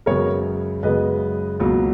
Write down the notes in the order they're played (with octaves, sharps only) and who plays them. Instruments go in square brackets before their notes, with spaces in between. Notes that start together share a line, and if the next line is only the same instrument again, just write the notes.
[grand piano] F#2 C#3 G#3 B3 A#4 C#5
F#2 C#3 G#3 B3 B4 D#5
C#2 B2 F#3 A#3